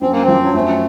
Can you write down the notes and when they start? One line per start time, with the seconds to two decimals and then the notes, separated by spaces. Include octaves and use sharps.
0.01 F#2 C4
0.12 A#3
0.23 C4
0.28 F3
0.43 F#3
0.54 F#2 A3